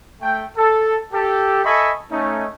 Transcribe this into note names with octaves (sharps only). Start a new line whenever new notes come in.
A3 G5
A4
G4 A4
A4 D#5 E5 G#5 B5 C#6
A3 C#4 D#4